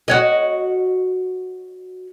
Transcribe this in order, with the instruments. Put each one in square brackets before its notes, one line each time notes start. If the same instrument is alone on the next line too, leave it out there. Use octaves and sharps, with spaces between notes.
[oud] F#4 C#5 D#5